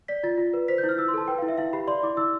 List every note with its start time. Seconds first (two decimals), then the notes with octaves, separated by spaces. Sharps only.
0.08 D5 B6
0.23 F4 A6
0.38 F4
0.53 B4
0.68 C5 B6
0.78 G6
0.84 E4
0.89 F6
0.98 E4 E6
1.08 C6
1.14 A4 A5
1.28 B4 G5
1.38 F5
1.42 E4
1.48 E5
1.58 E4 F5
1.73 G4 B5
1.87 D5 C6
2.03 E4 D6
2.17 E4 E6